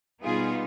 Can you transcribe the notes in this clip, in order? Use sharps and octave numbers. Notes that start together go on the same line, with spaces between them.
B2 G3 B3 D#4 F4 G#4